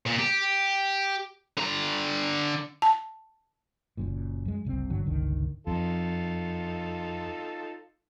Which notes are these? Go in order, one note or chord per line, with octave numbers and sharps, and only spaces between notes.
A#2
G4
D3 A#5
A5
F#1 F#2 A#2
F#2 G#3
F#1 C2 C3 C4
G1 G2 D3 F#3
G1 C#2 D3 D#3
F2 D#4 F4 A4